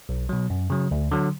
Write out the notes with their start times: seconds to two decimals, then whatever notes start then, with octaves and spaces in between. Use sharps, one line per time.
0.09 B1
0.29 B2 F#3
0.50 F#2
0.70 C#3 F#3
0.91 D2
1.11 D3 F#3